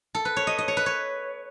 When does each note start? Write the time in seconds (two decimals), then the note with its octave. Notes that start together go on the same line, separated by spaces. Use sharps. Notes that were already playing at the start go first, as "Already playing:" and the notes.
0.15 A4
0.25 B4
0.36 C#5
0.47 D#5
0.58 D#5
0.68 C#5
0.77 B4
0.86 C#5